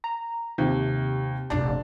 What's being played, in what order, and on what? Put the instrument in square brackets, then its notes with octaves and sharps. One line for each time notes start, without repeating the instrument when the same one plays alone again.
[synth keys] A#5
[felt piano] D#2 [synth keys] C3
[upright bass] F1 A#1 [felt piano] D4